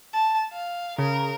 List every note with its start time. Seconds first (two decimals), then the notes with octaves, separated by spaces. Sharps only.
0.13 A5
0.53 F5
0.98 C#3 A#4